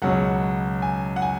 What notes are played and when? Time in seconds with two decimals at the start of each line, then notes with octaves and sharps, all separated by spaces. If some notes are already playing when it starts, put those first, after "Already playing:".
0.02 C#2 B2 F#3 C#4 F#5
0.82 G#5
1.16 F#5
1.22 G#5